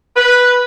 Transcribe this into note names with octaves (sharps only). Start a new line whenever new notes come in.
B4